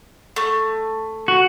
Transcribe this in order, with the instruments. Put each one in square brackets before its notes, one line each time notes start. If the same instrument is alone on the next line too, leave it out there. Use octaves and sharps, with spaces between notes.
[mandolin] A3
[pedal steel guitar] F#4